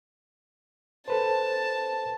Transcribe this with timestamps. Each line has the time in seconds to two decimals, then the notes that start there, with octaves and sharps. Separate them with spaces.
1.08 A4 B4 C5 A5